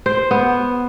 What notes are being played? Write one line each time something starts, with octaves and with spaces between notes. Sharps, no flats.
C5
B3